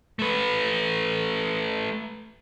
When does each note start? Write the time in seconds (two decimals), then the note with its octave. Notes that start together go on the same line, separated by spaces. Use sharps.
0.19 A3 B4